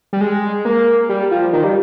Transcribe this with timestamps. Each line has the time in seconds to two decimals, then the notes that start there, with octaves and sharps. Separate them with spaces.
0.13 G3
0.21 G#3
0.65 A#3
1.09 G3
1.31 F3
1.53 D#3
1.64 G3